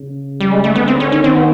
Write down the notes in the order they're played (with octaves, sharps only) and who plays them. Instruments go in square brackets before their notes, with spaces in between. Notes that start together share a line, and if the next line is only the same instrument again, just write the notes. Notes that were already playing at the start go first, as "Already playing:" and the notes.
Already playing: [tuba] C#3
[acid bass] G3
G#3
A3
[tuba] D3 [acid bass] B3
[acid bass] C4
C#4
[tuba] D#3 [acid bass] C#4
[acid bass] C4
B3